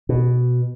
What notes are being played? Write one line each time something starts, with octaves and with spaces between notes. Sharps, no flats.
B2